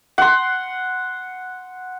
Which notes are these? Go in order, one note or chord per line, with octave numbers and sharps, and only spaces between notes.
F#5 C6